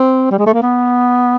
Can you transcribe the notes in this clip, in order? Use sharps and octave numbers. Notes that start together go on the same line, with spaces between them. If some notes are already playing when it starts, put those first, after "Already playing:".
Already playing: C4
G3
G#3
A3
A#3
B3